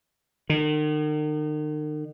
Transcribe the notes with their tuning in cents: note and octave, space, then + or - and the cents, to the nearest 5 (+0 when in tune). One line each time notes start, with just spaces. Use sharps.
D#3 -40